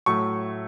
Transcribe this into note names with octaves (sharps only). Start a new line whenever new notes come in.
A2 F#3 A3 C#6